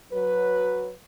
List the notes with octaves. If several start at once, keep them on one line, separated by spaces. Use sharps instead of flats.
F#3 B4